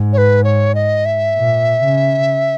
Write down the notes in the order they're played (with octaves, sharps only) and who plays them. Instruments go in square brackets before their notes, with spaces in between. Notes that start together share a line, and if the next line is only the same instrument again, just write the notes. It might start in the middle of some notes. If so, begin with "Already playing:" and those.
Already playing: [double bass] G#2
[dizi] C#5
B4
C#5
D#5
E5
[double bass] A#2
C#3